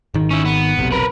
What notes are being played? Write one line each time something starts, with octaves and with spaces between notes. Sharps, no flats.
G#1 D#3
C#4 E4
B3
F1 B1 C3
A#4 B4